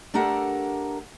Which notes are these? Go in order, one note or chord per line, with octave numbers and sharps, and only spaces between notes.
A3 D4 G4 A4 A#4 F#5